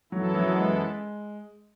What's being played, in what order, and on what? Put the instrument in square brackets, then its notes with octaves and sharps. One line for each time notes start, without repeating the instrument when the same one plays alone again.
[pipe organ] F#2 E3 B3 E4 A4 [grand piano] F#3
[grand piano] F#3
G#3